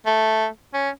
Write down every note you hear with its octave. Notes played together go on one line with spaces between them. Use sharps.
A3
C#4